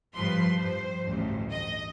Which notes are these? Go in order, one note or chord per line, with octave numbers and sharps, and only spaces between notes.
G2 F3 B4 C6
G2 C5
A1 D2 G2
D#5